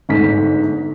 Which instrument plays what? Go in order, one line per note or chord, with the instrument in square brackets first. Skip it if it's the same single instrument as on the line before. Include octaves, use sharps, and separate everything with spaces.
[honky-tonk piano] G1 G#2 A3 B6